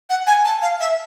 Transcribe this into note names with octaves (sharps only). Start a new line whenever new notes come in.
F#5
G#5
A5
F5
E5